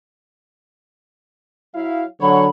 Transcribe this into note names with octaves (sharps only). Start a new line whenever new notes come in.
F#3 E4 F5
D3 F#3 C#5 B5